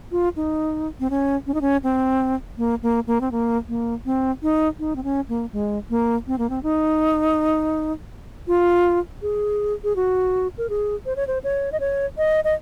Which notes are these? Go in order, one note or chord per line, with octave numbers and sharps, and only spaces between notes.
F4
D#4
C4
C#4
C#4
D#4
C#4
C4
A#3
A#3
A#3
C4
A#3
A#3
C4
D#4
D#4
C4
C#4
A#3
G#3
A#3
C4
A#3
C4
D#4
F4
G#4
G#4
F#4
A#4
G#4
C5
C#5
C5
C#5
D#5
C#5
D#5
D#5